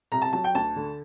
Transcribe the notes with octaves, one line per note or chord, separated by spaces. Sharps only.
C2 A#5
A5
F#3 A5
G5
D2 A5
D3